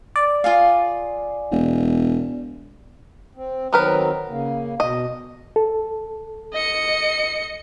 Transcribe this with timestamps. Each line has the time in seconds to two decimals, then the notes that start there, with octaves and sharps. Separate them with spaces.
0.16 D5
0.44 F4 G#4 F5
1.51 E1
3.35 C4
3.73 D#3 F#3 B3 C4 A#4 B4
4.29 C#3 A#3
4.80 B2 D#5
5.56 A4
6.53 D#5 C#7